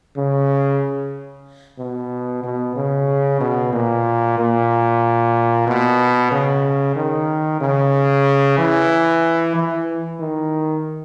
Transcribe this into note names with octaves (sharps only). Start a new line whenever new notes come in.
C#3
B2
B2
C#3
B2
A#2
A#2
B2
C#3
D#3
C#3
E3
E3
D#3